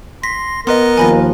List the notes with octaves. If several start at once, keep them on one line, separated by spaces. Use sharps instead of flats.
C6 A#6 B6
B3 A#4 B4 D#5 C6
D#2 F3 G#5 B5 A#6